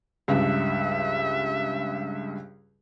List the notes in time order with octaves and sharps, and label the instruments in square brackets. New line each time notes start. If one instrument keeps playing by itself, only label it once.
[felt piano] C#2 G2 [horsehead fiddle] E5